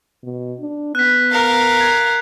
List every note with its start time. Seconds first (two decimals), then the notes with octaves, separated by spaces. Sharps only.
0.24 B2
0.60 D4
0.95 B3 F#6 B6
1.31 A#4 F5
1.81 G#6